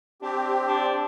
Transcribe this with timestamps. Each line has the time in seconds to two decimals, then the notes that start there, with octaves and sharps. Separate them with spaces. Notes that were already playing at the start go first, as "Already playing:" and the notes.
0.22 C4 D4 G4
0.67 D4